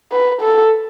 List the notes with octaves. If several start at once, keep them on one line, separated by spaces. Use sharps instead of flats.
B4
A4